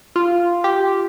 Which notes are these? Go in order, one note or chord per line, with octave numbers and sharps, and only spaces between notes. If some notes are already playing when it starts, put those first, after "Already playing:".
F4
G4